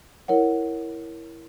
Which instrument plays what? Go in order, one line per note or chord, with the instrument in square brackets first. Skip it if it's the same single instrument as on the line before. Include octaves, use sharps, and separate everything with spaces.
[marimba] E4 A#4 C#5 F#5